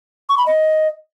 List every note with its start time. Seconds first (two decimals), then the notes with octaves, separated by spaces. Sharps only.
0.29 C#6
0.38 B5
0.46 D#5